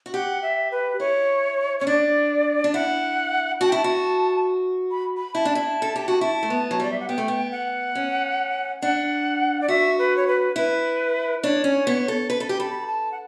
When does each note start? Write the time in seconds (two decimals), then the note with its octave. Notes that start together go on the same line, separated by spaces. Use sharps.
0.06 F#4
0.13 G4 F#5
0.42 E5
0.71 B4
1.00 E4 C#5
1.79 C#4 C#5
1.87 D4 D5
2.64 D4
2.74 E4 F#5
3.61 F#4 A5
3.68 G5
3.72 E4 A5
3.84 F#4
4.91 B5
5.17 B5
5.35 E4 A5
5.45 D4
5.55 E4
5.82 A4
5.96 G4
6.08 F#4
6.21 E4 A5
6.43 A3
6.50 B3
6.71 F#3
6.80 G3 D5
6.91 E5
7.00 F#5
7.08 B3 G5
7.18 A3
7.28 B3
7.52 F#5
7.95 C#4
8.82 D4 F#5
9.61 D5
9.68 F#4 E5
9.98 B4
10.17 C#5
10.28 B4
10.56 E4 B4
11.43 D4 C#5
11.64 C#4
11.87 B3
12.08 A4
12.30 B4
12.40 A4
12.49 G4
12.59 A4 B5
12.80 B5
12.87 A5
13.12 F#5